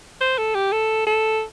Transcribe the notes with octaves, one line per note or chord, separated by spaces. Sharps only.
C5
A4
G4
A4
A4